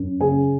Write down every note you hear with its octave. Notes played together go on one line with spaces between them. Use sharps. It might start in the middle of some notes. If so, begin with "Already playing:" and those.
Already playing: F#2
C#3 G#4 G#5